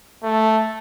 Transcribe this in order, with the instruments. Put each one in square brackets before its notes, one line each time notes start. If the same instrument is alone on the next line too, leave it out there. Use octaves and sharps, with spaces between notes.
[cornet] A3